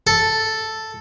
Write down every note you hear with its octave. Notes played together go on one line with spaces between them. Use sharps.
A4